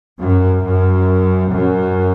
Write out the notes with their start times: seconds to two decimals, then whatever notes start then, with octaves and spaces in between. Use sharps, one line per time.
0.20 F#2
0.63 F#2
1.51 F#2